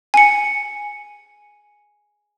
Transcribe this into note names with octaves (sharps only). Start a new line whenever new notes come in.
G#5 C#7